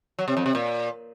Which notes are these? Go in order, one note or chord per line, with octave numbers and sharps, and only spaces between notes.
F#3
C3
F2
C3
A#2